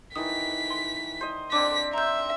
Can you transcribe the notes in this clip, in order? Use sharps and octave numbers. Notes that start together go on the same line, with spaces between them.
D#3 E3 D#6 B6
C6
C5 D#5
C4 D4 D6 B6
E5 A#5 G6